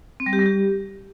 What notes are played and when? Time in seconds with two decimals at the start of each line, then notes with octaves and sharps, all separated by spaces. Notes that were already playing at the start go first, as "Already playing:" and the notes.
0.20 C4
0.26 G3
0.33 G4
0.39 G3
0.46 G4